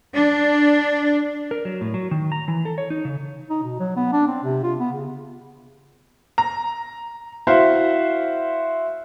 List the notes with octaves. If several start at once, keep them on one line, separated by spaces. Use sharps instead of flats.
D4
A#4
F#3
A2
F#3
D#3
A#5
E3
A4
C#5
D#4
C#3
D#4
B2
F#3
B3
D4
C4
C3
F4
B3
C#3
A#5
E4 F#4 C5 E5 F5